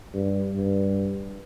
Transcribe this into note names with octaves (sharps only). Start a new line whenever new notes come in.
G2
G2